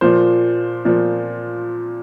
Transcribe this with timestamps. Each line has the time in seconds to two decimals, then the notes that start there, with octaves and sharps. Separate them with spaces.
0.01 A#2 F3 C5
0.85 A#2 F3